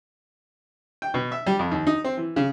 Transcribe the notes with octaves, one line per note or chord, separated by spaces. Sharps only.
G5
B2
E5
G3
F2
D#2
D#4
C4
E3
C#3